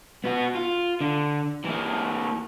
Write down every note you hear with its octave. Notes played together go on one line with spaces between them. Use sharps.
B3 F#4
F4
D3
E3 A#3